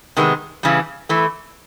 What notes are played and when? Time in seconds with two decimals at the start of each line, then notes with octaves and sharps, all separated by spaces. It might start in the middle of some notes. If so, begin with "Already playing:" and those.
0.17 C3 D#3 G#3 B3
0.63 C#3 E3 G3
1.09 E3 A3